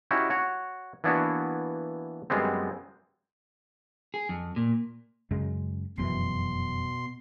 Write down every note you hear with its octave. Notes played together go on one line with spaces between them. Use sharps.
C#4 D#4 E4 F#4 G4
F#4 C#5
E3 A#3 B3 D4 E4 F#4
F#2 G3 G#3 B3 C4
G#4
F2
A#2
F#2 C#3 G#3
F1 F#2 B2 E3 C6